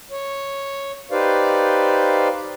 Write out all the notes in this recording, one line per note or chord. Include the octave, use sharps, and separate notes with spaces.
C#5
D#4 G4 B4 C5 D5 F5